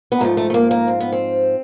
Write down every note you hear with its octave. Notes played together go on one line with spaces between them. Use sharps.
B3
G#2 F3 A3 A#3
A3
A3
A#3
A#3
C4
B3
C4